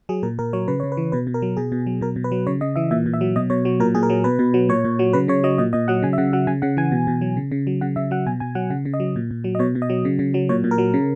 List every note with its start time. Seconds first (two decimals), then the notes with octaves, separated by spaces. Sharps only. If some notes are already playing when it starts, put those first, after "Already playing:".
0.09 F#3 G#4
0.23 A#2 A#4
0.39 A#2 A#4
0.53 F#3 C#5
0.68 C#3 B4
0.80 C#3 C#5
0.92 B4
0.97 E3
1.12 B2 B4
1.27 B2
1.34 A#4
1.42 F#3
1.57 B2 G#4
1.72 B2
1.87 F#3
2.01 B2 A#4
2.16 B2
2.24 B4
2.32 F#3
2.47 C#3 C#5
2.61 C#3 D#5
2.76 E3 E5
2.91 A#2 E5
3.06 A#2
3.13 E5
3.21 F#3
3.36 B2 D#5
3.50 B2 C#5
3.65 F#3
3.80 A#2 A#4
3.95 A#2 G#4
4.03 A#4
4.10 F#3
4.24 B2 B4
4.39 B2
4.54 F#3
4.69 A#2 C#5
4.85 A#2
4.99 F#3
5.13 C#3 B4
5.28 C#3 C#5
5.44 F#3 D#5
5.58 A#2 D#5
5.73 A#2 D#5
5.88 F#3 F#5
6.02 C#3 G#5
6.13 E5
6.18 C#3 F#5
6.33 F#3 F#5
6.47 C#3 G#5
6.62 C#3 F#5
6.77 E3 G#5
6.92 B2
7.07 B2
7.21 F#3
7.37 C#3
7.51 C#3
7.67 F#3
7.81 C#3 F#5
7.96 C#3 E5
8.11 F#3 F#5
8.26 B2 G#5
8.40 B2 G#5
8.55 F#3 F#5
8.70 C#3 F#5
8.85 C#3
8.94 D#5
9.00 F#3
9.16 A#2
9.31 A#2
9.44 F#3
9.55 D#5
9.59 B2 C#5
9.75 B2
9.82 D#5
9.90 F#3
10.05 C#3
10.19 C#3
10.34 F#3
10.49 A#2 C#5
10.64 A#2
10.71 A#4
10.78 F#3
10.94 C#3